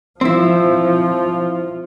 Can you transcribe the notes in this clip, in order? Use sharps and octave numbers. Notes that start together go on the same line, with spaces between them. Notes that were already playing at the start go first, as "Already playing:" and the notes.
F3 C4 E4